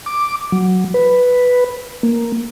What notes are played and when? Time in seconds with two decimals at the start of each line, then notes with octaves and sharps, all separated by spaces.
0.06 D6
0.52 F#3
0.94 B4
2.03 A#3